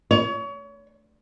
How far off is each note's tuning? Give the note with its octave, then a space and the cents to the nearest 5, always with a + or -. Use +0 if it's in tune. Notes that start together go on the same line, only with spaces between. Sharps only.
C#5 +30